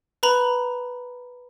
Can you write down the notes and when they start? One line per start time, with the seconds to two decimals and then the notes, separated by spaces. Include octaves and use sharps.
0.23 B4 A#5 B5